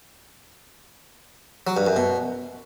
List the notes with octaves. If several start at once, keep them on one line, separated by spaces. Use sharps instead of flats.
F#3
G2
F#2
B2